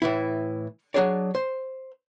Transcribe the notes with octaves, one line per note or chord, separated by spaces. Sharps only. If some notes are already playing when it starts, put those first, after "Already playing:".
A2 E3 E4
F#3 C#4 D4 G#4 C#5 D5
C5